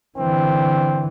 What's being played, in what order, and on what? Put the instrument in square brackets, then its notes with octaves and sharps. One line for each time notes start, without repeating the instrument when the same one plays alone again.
[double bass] D3 E3 [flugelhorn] C4